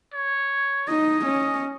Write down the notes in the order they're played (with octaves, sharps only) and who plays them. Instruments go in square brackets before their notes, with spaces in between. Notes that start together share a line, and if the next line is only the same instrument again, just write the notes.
[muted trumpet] C#5
[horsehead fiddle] D#4 [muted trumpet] D#5
[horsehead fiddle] C#4